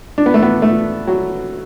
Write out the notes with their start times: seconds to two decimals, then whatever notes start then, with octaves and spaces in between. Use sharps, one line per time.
0.18 D4
0.26 B3
0.34 A3
0.42 B3
0.62 A3
1.08 F#3